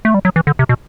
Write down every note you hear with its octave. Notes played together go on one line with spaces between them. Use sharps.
A3
G3
F#3
E3
D3
C3
B2